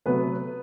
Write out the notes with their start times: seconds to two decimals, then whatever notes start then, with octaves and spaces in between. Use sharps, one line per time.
0.06 C3 F#3 A3 B3 B4